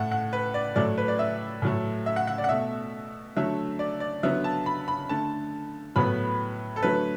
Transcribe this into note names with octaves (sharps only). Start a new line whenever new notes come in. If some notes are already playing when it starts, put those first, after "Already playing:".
Already playing: A2 A3 F#5
F#5
B4
D5
A2 F#3 A3 D5
B4
D5
E5
A2 F#3 A3
E5
F#5
F#5
D5
F#5
B2 A3 E5
D3 F#3 A3 E5
D5
D5
D3 F#3 B3 E5
A5
B5
B5
D3 A3 A5
A2 F#3 B3 B5
A4
D3 F#3 A3 B4